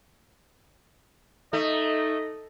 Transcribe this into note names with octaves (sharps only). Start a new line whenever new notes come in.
A3 D#4 D#5